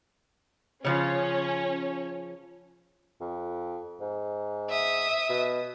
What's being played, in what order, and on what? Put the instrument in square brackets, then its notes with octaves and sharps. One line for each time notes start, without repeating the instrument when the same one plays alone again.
[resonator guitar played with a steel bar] C#3 F3 F4 [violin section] C#4 C#5
[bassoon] F2
G#2
[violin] E5 D#6
[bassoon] B2